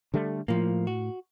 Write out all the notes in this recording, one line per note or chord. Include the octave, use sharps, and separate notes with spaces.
D3 G3 A3
A2 F3 A#3
F#4